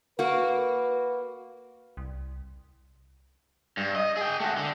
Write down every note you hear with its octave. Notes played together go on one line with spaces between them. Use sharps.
A#3 F#4 B4
C2
G2
D#5
G#4 G5
A3 F#4
D3